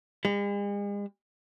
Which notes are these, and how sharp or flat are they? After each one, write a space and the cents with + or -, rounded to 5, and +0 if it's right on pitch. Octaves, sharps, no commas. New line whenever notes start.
G#3 -45